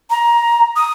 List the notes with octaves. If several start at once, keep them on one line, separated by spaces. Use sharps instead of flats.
A#5
D#6